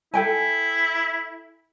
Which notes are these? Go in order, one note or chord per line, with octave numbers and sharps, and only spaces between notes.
E4 A4 G5 G#5